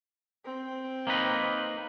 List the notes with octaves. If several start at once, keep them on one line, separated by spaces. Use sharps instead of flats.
C4
A#3 D#4 B4